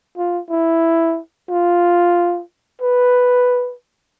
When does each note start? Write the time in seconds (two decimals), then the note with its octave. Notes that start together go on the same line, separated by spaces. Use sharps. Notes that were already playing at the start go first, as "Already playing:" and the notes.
0.17 F4
0.50 E4
1.49 F4
2.82 B4